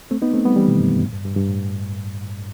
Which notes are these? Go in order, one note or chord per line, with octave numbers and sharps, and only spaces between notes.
A3 C4
B3 D#4
A3 C4
G3 B3
E3 G3
B2 D#3
F#2
G2
A2
G2
G2
G2
A2